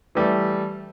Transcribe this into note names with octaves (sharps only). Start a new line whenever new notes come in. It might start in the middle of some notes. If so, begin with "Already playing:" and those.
E3 G3 A3